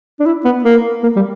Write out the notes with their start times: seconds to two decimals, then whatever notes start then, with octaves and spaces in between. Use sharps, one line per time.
0.20 D4
0.26 E4
0.45 B3
0.64 A#3
1.03 A#3
1.16 G3